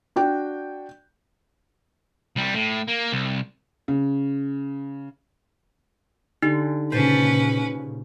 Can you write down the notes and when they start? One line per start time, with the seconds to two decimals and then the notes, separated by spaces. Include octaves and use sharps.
0.16 D4 F#4 G5
2.36 C2 G3
2.55 A2
2.88 A#3
3.12 C2
3.88 C#3
6.42 D3 D#4 G4
6.92 A#2 C#3 C#4 B4 C5 A5